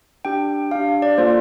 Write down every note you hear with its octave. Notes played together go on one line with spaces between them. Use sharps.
D4 G4 G5
D4 G4 F5
D5
A#3 F4 A4 C5